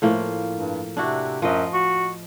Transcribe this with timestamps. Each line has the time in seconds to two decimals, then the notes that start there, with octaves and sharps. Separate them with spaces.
0.02 A2 F3 A#3
0.57 G2
0.97 C3 D4 E4 F#4
1.42 F#2 F3 D#5
1.73 F#4